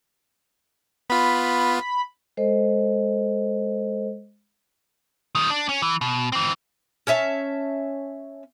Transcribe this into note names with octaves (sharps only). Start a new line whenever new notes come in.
B3 F4 B5
G#3 A4 C5 D#5
D#3 G3
D4
C#4
E3
B2
E3 C4
C#4 C#5 E5 A5